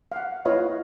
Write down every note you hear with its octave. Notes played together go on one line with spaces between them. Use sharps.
F5 F#5
E4 F4 B4 C#5 D#5 F5